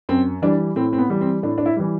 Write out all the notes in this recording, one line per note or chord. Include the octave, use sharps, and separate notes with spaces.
F#2 C4
E3 G3 D4
A2 C4
C4
B3
E3 G3
C4
A2 D4
D4
E4
E3 G3